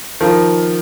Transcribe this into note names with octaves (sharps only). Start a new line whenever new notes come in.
D#3 F3